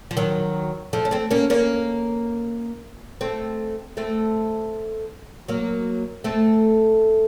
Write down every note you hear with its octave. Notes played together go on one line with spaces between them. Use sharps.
F3
D#3 F#3
F3 A3
C#4
A3 C4
A#3 C#4
A#3 C#4
A3 C4
A3 C4
F#3 A#3
A3 C4